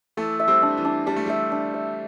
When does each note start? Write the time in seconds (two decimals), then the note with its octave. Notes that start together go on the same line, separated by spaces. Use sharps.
0.17 E3 A3 A4
0.40 E5
0.47 G3 C4
0.62 D4
0.77 E3
0.85 D4
1.07 G3 D4
1.16 A3
1.26 G3 E5
1.52 D4
1.74 E5